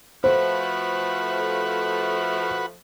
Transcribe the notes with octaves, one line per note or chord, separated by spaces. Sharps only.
F3 A3 F#4 B4 C5